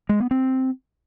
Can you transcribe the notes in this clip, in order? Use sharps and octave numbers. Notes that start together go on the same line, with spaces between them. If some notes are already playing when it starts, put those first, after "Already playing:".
G#3
B3
C4